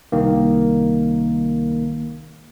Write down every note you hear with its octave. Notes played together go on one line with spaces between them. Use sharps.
C2 D#3 A#3